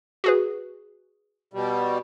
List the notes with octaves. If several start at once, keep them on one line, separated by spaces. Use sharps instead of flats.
F#4 G#4 B4
B2 G3